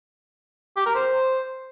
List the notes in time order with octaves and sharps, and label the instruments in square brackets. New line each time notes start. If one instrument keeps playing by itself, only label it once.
[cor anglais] G4
A#4
C5